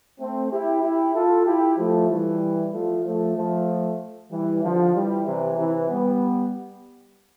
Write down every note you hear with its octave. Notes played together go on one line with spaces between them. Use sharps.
A3 C4
E4 G4
E4 G4
F4 A4
E4 G4
F3 A3
E3 G3
F3 A3
F3 A3
F3 A3
E3 G3
D3 F3
E3 G3
C3 E3
C3 E3
G3 B3